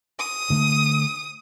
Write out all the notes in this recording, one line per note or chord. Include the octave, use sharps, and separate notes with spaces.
D#6
D3 A3